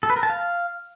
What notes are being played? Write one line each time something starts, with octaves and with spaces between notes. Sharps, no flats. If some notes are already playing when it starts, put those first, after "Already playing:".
A4
B4
A#4
A5
F5